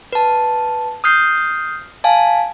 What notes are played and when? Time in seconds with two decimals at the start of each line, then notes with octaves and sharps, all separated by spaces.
0.13 B4 A5
1.04 D#6 F6 G6 C7
2.04 F5 G#5 A5